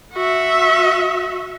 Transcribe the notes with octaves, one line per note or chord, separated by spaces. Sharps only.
F#4 E5